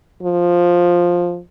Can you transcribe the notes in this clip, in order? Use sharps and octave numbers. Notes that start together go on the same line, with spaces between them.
F3